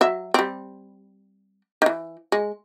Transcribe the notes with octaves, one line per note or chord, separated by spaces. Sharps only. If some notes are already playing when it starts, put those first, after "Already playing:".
F#3 E5
G3 C4
D#3 E3
G#3